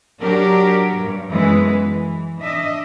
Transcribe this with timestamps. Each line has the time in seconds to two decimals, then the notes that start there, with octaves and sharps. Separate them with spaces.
0.21 F#3 D4 G4 A#4
0.98 G2
1.30 F#2 E3 G#3 B3 B4
1.83 E3
2.42 D4 D#5 E5